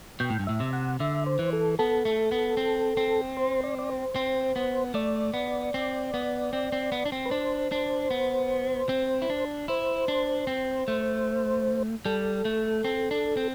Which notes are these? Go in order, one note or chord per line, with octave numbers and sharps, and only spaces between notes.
B2 G5
A2
G2
A2 E5
C3
F#5
D3 E5
C5
E3
A4
B3 A4
A3
B3
C4
C4
C5
D5
D5
C5
C4
B3
A3 D5
B3
C4
B3
C4
C4
B3
D4
C4
B4
D4 C5
D4
B3
C4
E4
D4
E4 C5
D4
C4
A3
G3 A4
A3
C4
D4
C4